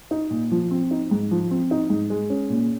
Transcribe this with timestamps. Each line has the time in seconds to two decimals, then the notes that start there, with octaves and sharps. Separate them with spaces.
0.11 D#4
0.31 A#2
0.51 F3
0.71 C4
0.91 D#4
1.11 G#2
1.31 F3
1.51 C4
1.71 D#4
1.90 G#2
2.10 G#3
2.30 C#4
2.50 A#2